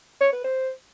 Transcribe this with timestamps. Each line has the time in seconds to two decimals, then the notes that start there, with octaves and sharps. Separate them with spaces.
0.21 C#5
0.32 B4
0.44 C5